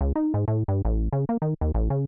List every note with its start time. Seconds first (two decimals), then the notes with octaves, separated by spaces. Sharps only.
0.01 C#2
0.16 D#4
0.34 G#2
0.48 A2
0.68 G2
0.85 A1
1.12 C#3
1.29 A#3
1.42 D#3
1.61 D#2
1.75 A1
1.90 C#3